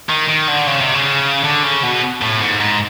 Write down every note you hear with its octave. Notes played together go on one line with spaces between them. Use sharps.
D#3
D#3
D3
C#3
C3
C#3
D3
C#3
B2
A2
G#2
G#2